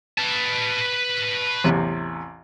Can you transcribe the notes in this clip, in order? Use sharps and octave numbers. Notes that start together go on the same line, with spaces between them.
B4 A5
A1 E2 C3